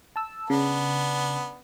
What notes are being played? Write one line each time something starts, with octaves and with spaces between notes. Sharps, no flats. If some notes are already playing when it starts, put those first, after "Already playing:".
A5 E6
C#3 B3 D4